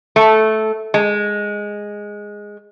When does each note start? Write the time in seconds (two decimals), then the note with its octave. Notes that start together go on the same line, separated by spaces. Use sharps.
0.16 A3
0.94 G#3